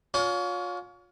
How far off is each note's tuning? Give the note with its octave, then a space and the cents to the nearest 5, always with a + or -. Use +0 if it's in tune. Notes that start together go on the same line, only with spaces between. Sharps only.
C#4 +35 F4 +35